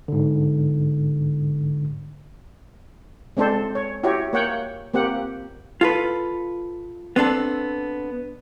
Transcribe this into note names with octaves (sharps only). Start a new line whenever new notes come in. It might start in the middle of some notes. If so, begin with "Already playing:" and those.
G#2 D3
G#3 C4 D4 A4 C5
C#5
E4 F#4 G4 C#5
A#3 C#5 F#5 G5
A#3 C4 G4 F#5
F4 A4 B4
B3 C4 D4 A4